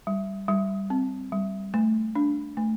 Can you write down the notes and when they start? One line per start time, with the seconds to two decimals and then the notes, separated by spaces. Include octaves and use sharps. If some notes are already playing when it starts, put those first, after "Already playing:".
0.07 G3
0.49 G3
0.90 C4
1.32 G3
1.74 A3
2.15 D4
2.57 A3